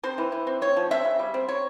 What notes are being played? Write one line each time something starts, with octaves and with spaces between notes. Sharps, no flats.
C4 C5
E3
E3
C4
C4 C#5
F3
C4 E5
C#3
G3
C4
C4 C#5